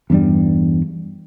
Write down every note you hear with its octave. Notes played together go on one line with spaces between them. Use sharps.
E2 G2 G3